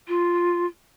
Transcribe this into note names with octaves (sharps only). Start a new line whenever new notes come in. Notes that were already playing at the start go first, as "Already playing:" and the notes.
F4